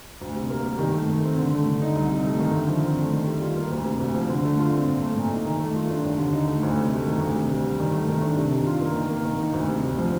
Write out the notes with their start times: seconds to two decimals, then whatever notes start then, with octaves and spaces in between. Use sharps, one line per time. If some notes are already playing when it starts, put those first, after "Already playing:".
0.21 D2
0.35 C3
0.50 A#3
0.65 G3
0.79 D#3
0.94 A3
1.09 D#3
1.24 C4
1.38 D3
1.53 A3
1.66 D3
1.82 D#4
1.95 C2
2.10 C3
2.25 A3
2.40 D#3
2.55 D3
2.69 F3
2.83 C4
2.98 A3
3.12 D#3
3.26 G3
3.42 F4
3.57 A#3
3.71 D2
3.86 C3
4.00 D2
4.14 F3
4.29 D3
4.43 A3
4.59 F4
4.72 C4
4.87 A#2
5.02 A3
5.17 A#2
5.31 D#4
5.46 D#3
5.60 A3
5.76 F4
5.90 D4
6.04 D#2
6.19 D3
6.33 D#4
6.48 A3
6.63 D2
6.77 C3
6.92 A3
7.06 D#3
7.21 D2
7.36 C3
7.50 D2
7.65 G3
7.80 D#3
7.94 A3
8.09 D#3
8.22 D4
8.37 C3
8.52 D#3
8.66 F4
8.81 A#3
8.95 D#3
9.10 A#3
9.25 D#3
9.40 D#4
9.53 D2
9.69 C3
9.83 D2
9.98 F3